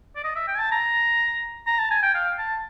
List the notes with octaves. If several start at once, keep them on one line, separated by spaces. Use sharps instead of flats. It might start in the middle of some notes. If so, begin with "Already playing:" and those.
D5
D#5
E5
G5
G#5
A5
A#5
A#5
A5
G#5
G5
F5
A5